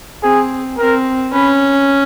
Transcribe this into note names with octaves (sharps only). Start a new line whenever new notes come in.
C4 G#4
C4 A#4
C#4 B4